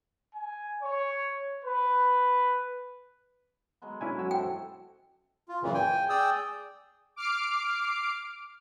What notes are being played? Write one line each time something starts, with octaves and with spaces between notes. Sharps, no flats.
G#5
C#5
B4
F#3 G#3 B3
B3 C#4 D4 E4 F#5 G#5
F#2 F#4 E6
A4 C5 G5
F4
F#2 A#2 C#3 E3
G5 G#5
G#4 D5 G5 D#6 E6
D6 F6 C7 D7